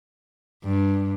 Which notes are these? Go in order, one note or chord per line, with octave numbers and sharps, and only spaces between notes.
G2